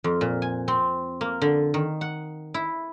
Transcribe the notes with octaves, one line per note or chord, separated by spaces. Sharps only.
F2
A#2
G#5
C4
A#3
D3
D#3
F#5
E4